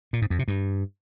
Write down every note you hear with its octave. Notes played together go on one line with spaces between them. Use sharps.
A#2
G#2
F2
C3
G2